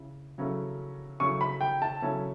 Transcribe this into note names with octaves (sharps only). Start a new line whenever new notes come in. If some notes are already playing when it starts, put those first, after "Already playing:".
Already playing: C#3 E4
C#3 F#3 C#4 E4 A4
C#3 F#3 C#4 E4 A4 C#6
B5
G5
A5
C#3 F#3 C#4 E4 A4